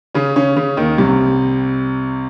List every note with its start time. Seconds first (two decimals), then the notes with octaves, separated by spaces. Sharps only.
0.15 C#3 C#4
0.36 C#3 C#4
0.56 C#3 C#4
0.77 D#2 D#3
0.98 C2 C3